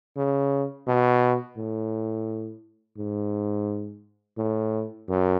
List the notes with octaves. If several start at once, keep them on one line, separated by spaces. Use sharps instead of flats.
C#3
B2
A2
G#2
A2
F#2